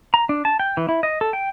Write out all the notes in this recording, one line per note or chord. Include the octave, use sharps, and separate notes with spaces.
A#5
D4
A5
G5
E3
E4
D#5
A4
G5